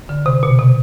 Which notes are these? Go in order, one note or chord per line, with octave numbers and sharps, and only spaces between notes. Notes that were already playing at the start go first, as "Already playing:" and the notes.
D3
C3
B2
C3